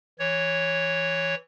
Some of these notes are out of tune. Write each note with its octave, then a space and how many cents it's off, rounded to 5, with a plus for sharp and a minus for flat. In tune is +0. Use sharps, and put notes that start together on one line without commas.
E3 +0 C#5 +0